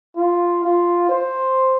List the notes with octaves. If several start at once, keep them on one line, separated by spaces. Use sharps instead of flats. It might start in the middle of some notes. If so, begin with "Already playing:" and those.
F4
F4
C5